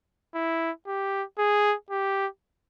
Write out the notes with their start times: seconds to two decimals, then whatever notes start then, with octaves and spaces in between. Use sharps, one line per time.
0.35 E4
0.87 G4
1.39 G#4
1.90 G4